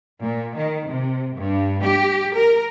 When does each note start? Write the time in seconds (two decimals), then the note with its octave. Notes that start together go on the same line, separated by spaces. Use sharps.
0.21 A#2
0.56 D#3
0.89 C3
1.37 G2
1.83 G4
2.36 A#4